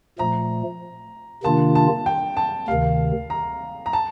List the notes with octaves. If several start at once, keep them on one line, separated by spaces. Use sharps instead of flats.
A#2 F3 A3 A#5
C3 D#3 A#3 D4 F4 A5
A5
G5
A5
D2 C3 D#3 F5
A#5
A#5
A5